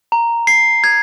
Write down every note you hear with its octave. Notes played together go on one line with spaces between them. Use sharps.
A#5
C7
G#6